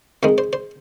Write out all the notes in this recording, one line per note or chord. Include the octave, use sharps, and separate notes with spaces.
F2 D#3 G#3 C5
C5
C5